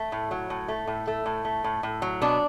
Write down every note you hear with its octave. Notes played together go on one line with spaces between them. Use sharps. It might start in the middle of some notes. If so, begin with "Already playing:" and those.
Already playing: A3
A2
F#3
A2
A3
A2
A3
A2
A3
A2
A2
F#3
B2 D4